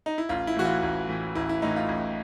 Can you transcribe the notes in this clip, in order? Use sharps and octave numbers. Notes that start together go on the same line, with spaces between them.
D#4
E4
A1 F4
E4
A2 E3 F#4
F4
A1
A2 E3
A1 E4
E4
A2 E3 D#4
F4
A1